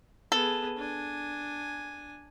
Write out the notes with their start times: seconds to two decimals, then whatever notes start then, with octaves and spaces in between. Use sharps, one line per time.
0.32 B3 G#4 A4
0.77 D4 G#5